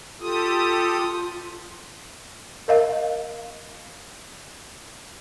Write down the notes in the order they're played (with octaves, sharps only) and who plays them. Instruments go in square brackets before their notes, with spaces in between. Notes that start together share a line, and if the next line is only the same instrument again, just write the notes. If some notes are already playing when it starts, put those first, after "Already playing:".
[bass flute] F4 [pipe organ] G4 A4 D#6
[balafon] A#4 D#5 F5